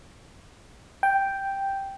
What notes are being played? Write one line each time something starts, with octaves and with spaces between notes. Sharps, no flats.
G5